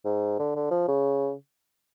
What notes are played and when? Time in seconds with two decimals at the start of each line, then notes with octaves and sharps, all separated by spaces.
0.05 G#2
0.39 D3
0.56 D3
0.71 F3
0.88 C#3